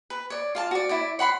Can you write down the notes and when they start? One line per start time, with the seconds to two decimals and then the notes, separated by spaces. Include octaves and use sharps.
0.10 B4
0.30 C#5 D5
0.55 F4 F5 A5
0.71 F#4 D5
0.89 E4 C#5 D5
1.19 C#5 F#5 B5 C6